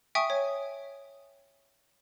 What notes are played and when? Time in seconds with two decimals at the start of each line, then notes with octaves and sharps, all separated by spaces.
0.15 E5 G5 G#5 C#6 D#6
0.30 C#5